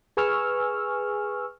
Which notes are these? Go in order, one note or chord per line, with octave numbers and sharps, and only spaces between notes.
G#4 B4 G#5 C#6 E6 F6